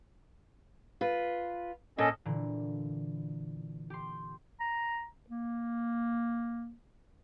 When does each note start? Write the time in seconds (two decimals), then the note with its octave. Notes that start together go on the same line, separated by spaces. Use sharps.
1.01 F4 B4
1.98 A#2 C#4 A4 D#5
2.25 A#2 D3 E3
3.90 G4 C6
4.60 A#5
5.30 A#3